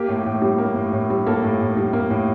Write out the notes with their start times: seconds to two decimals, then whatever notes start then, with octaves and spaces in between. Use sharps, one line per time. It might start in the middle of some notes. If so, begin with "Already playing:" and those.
Already playing: A#3 G4
0.09 A2
0.26 A2
0.42 G3
0.58 A#3
0.76 A2
0.93 A2
1.10 G3
1.26 A#3 A4
1.44 A2
1.60 A2
1.77 G3
1.93 A#3
2.10 A2